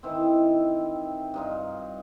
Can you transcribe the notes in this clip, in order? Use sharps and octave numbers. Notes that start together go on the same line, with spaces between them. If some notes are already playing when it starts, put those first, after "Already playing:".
D#3 E3 C4
G2 D#4 F4